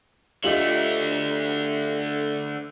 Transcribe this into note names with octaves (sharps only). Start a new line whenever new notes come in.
D3 A3 F4 G4 D#5